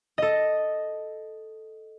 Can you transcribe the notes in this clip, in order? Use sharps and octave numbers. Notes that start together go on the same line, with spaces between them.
A4 D#5